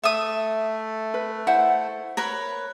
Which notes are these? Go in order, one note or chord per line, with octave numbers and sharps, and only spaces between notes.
A3 E5 D#6
B4
E4 C5 F#5
A#4 B4 C#5